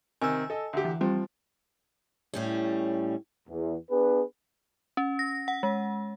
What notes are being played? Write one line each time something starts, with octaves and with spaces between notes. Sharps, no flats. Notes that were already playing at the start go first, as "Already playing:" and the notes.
C3 D#3 G#5 E6
A4 D#5
D2 G4
E3
F3 G3 C4
A2 G3 C#4
E2
B3 D4 G#4 B4
C#4
A#6
F#5
G#3